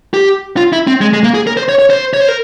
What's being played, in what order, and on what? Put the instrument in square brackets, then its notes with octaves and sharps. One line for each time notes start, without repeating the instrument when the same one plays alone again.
[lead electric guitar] G4
F4
E4
C4
G#3
G#3
A#3
G#4
A#4
C5
C#5
C#5
C5
C#5
C5
A#4